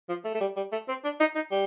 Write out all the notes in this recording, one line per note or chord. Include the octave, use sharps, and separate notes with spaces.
F3
A3
A3
G3
G3
A3
C4
D4
D#4
D#4
G3